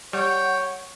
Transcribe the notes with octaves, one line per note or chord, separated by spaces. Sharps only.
G3 C#5 F#5 G5